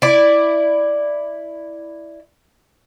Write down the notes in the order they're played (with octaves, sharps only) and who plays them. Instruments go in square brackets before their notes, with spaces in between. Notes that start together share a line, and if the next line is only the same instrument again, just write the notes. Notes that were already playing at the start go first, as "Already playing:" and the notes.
[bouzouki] E4 D5